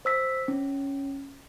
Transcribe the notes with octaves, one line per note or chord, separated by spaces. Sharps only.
C5 E6 B6
C#4